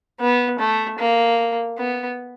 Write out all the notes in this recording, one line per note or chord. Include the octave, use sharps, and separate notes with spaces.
B3
A3
A#3
B3